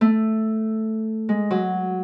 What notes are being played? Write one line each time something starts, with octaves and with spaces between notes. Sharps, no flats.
A3
G#3
F#3